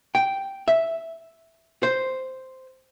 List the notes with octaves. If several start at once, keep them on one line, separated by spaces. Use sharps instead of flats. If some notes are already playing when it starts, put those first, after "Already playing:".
G5
E5
C5